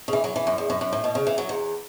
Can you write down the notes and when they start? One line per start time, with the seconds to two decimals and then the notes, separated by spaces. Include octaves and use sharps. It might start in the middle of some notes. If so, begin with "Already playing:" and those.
0.08 C#3
0.13 E3
0.24 F#3
0.36 E3
0.47 F#2
0.58 E2
0.70 F#2
0.81 F#2
0.93 A2
1.04 B2
1.15 C#3
1.27 E3
1.38 F#3
1.49 E2